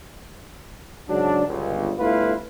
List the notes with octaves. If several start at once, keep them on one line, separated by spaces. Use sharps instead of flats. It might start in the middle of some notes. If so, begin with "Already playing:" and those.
G#2 C#3 F#3 D4
G1 C#2
G1 A3 E4 F4 B4 F5